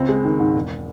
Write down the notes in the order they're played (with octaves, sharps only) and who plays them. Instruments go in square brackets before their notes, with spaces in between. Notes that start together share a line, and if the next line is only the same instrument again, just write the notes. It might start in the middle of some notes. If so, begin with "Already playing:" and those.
Already playing: [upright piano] C#2 C4
G#3
D#3
G#2
E1